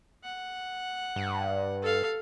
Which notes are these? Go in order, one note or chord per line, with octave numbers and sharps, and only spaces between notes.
F#5
G2
A4 F5